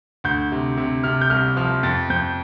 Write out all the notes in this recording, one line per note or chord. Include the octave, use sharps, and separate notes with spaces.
D2 G6
C3
C3
C3 F6
G6
C2 F6
F3 F6
F2 A6
F2 G6